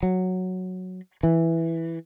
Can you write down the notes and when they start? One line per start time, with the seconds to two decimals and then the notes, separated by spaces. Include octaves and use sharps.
0.03 F#3
1.23 E3